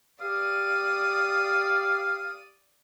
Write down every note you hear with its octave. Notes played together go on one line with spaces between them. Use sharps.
G4 D5 F5 D#6